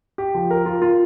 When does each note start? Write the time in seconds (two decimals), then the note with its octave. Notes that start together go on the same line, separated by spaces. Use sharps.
0.18 G4
0.35 F3
0.51 A#4
0.66 F4
0.82 F4